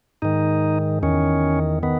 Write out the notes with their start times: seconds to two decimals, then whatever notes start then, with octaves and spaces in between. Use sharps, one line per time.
0.22 G#2 D#3 D#4
1.03 E2 D#3 C#4
1.83 D#3 B3